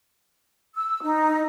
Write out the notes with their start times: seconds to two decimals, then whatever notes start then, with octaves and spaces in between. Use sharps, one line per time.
0.76 E6
1.02 D#4